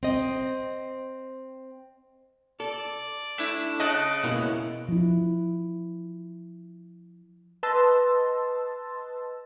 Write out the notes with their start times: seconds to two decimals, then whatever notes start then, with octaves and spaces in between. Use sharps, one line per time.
0.03 C4 D#5
2.60 A4 D5
3.38 A3 D4 E4
3.80 C#3 D#5 A5 F#6
4.24 B2 A#3 E4
4.88 F3 E4
7.63 B4 D#5 A5 C6 E6 A6